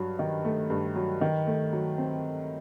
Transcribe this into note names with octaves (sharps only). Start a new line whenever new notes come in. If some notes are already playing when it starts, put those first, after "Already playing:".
Already playing: G2 F#3
D#3
A3
G2
F#3
D#3
A3
F#3
C4